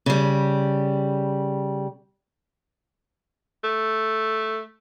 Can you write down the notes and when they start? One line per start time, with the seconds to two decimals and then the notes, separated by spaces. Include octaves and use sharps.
0.06 C#3 G3
3.64 A3